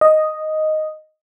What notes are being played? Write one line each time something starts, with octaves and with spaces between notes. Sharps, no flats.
D#5